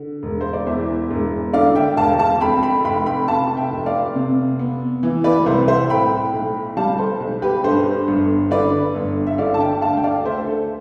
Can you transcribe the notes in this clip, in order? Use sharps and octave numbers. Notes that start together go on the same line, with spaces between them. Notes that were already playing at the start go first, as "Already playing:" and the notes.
Already playing: D3
E1
C5
D5
E2 C5 E5
E1
D3 D5 F5
E5 G5
E1 F5 A5
F5 A5
F2 G5 B5
G5 B5
F1 G5 B5
G5 B5
C3 F5 A5
E5 G5
F1
D5 F5
C3
B3
E3
B4 D5
C2 C5 E5
C5 E5
A2 G5 B5
B1
G3 F5 A5
A4 C5
B1
G4 B4
G2 A4 C5
G1
D3 B4 D5
G1
E5
D3 D5 F5
A5
E5 G5
D2 F5 A5
G5
D5 F5
A3 C5 E5
A4